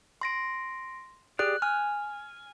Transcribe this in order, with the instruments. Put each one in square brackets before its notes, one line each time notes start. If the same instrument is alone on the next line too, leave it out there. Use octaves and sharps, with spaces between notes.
[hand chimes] C6 A#6 D7
[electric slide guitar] G4 G#4 D5 [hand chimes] F#6
[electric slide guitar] G#5 [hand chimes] F6